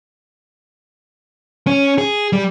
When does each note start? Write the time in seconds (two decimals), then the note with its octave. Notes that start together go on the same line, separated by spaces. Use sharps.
1.67 C#4
1.98 G#4
2.33 G3